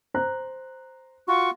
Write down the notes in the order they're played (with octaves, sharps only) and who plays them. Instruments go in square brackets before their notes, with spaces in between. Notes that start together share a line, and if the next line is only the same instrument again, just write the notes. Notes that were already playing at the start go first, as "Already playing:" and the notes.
[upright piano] C5 A#5 F#6
[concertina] F4 F#4 [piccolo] C#6